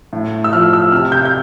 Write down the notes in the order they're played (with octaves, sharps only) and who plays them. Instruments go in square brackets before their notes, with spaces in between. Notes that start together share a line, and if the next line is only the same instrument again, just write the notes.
[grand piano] A2
E6
F3 F6
E6
C3 F6
G6
G6